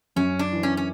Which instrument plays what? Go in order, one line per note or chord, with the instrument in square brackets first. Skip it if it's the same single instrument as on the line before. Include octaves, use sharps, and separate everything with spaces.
[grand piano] F#2 [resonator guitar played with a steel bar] C#4
[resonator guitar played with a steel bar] D4
[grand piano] E3
[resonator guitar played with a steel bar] C#4
C#4